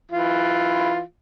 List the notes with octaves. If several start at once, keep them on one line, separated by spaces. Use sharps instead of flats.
E3 F4